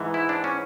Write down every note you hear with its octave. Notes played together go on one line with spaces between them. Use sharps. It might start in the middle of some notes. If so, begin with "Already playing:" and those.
Already playing: G#2 E3
E4
D4
C#4